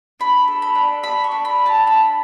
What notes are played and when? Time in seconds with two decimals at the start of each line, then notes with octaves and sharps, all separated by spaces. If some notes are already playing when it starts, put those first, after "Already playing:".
0.20 D4 B5
0.48 A4
0.62 B5
0.75 D4
1.03 A4 B5
1.24 C#6
1.31 D4
1.45 B5
1.59 A4
1.66 A5
1.86 D4 B5